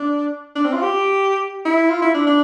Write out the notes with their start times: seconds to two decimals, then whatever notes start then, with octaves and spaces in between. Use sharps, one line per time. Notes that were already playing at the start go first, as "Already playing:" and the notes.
Already playing: D4
0.56 D4
0.65 C4
0.74 F4
0.83 G4
1.65 E4
1.90 F4
2.02 E4
2.14 D4
2.27 D4